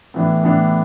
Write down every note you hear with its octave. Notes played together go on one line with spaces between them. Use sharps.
A2 E3 B3 D4
A2 E3 B3 D4